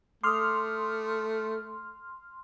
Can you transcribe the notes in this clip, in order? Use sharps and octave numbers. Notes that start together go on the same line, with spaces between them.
A3 C6 D6 D#6 F6